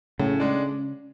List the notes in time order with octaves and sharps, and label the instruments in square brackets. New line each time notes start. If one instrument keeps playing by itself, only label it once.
[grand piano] A2 [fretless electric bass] C#3
[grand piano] G#3 D4